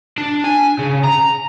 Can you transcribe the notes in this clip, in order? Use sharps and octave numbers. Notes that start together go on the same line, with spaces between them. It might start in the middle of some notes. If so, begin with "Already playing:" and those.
D4
G#5
C#3
A#5